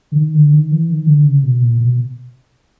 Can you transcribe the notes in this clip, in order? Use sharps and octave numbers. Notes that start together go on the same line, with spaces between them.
D3
D#3
D3
D#3
E3
D#3
D3
C#3
B2
A#2
B2